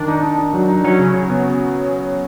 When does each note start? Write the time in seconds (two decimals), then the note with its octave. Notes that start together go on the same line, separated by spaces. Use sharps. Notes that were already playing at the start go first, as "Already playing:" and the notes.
Already playing: D#3 D4
0.08 D#4
0.23 D#4
0.38 D#4
0.54 F#3
0.68 D#4
0.84 F#3 C#4
0.99 C#3
1.14 C#3
1.30 B3